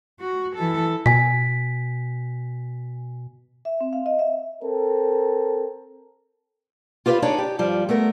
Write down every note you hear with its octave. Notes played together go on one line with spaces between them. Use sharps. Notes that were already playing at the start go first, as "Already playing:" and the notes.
F#4
E3 A4
B2 G#5 B6
E5
C4
F5
D#5
E5
C4 A4 A#4
F4 G4 B4 C5 D5 F5
D4 D#4 G#4 C#5 D5
G4
G2 F3 G3
A3 B3 A#4